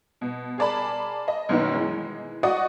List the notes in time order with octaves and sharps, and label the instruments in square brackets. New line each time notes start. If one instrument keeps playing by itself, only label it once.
[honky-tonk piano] B2
G#4 A#4 D5 A5 B5
D#5
F#2 B2 D#3 A#3 B3 D#4
E3 G#3
F#4 D5 D#5 F#5 C#6 D#6